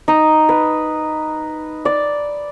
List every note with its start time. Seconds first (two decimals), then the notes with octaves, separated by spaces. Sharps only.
0.08 D#4
0.49 B4
1.85 D5